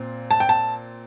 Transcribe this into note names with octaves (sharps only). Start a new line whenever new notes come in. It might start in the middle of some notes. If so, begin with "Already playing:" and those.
Already playing: A#2 C4
A5
G5
A5